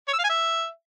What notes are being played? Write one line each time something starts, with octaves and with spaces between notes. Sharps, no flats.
C#5
E6
F5
G#5
E5